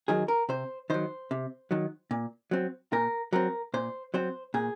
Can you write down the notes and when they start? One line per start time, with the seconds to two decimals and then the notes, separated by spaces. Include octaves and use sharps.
0.08 D#3 F#3 G#4
0.28 A#4
0.49 C3 C5
0.90 D#3 F#3 C5
1.31 C3
1.71 D#3 F#3
2.11 A#2
2.51 F#3 C4
2.92 A#2 A#4
3.33 F#3 C4 A#4
3.74 A#2 C5
4.14 F#3 C4 C5
4.54 A#2 G#4